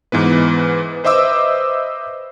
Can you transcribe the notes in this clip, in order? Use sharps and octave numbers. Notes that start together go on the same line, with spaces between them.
G#2 E3 B3 B4
B4 C5 D#5 E5 D6 E6